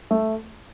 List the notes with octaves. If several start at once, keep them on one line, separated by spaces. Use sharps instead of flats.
A3